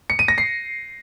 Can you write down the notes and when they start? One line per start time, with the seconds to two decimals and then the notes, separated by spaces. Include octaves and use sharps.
0.10 C#7
0.19 D#7
0.28 A#6
0.38 C7